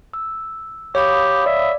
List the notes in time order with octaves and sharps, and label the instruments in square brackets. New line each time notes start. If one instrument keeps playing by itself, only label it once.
[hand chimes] E6
[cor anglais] G4 [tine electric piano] C#5 [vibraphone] F5 B5 D#6
[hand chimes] D5 [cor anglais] E5